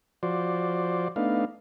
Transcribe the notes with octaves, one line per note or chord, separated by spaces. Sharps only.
F3 F#4 C5 D5
A3 B3 D4 D#4 F5